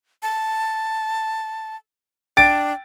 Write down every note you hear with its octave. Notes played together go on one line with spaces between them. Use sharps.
A5
D4 G5 A6 D7